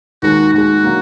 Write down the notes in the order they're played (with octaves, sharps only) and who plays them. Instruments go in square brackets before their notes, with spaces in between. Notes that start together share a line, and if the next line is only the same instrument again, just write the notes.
[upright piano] D#2 D#3 G#3 [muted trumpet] F#4
[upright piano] D#2 D#3 G#3 [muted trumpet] F#4
[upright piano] D3 F#3 A#3